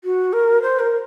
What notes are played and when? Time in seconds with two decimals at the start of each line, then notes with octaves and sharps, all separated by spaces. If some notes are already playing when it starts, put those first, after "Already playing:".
0.04 F#4
0.33 A#4
0.62 C5
0.79 A#4
0.90 A#4